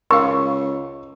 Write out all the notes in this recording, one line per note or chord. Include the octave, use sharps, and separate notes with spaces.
C#2 A#4 F5 C#6